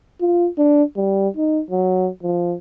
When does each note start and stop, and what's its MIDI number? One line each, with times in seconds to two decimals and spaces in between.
0.21 0.48 65
0.58 0.83 62
0.96 1.28 55
1.37 1.61 63
1.70 2.09 54
2.23 2.55 53